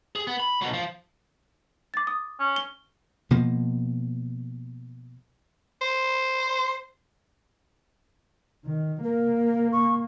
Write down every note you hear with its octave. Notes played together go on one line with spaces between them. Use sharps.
G#4
B3
B5
B2 F#3
F3
D6 A6
D#6
C#4
G7
B2 F3 A#3
C5
D#3
A#3 A#4
C#6